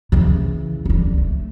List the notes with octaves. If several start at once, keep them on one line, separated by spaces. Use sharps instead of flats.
C#3 E3
C#2 D3
A3